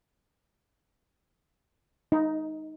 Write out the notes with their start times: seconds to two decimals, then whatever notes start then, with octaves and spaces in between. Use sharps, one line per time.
2.12 D#4